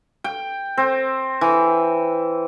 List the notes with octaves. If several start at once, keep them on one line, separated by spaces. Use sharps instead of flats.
G5
C4
E3